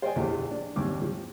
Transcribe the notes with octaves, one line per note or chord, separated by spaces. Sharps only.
C5 D5 D#5 G5 G#5
A#1 E2 A3 F4 G4
D4
D#2 G#2 C4 D6
F3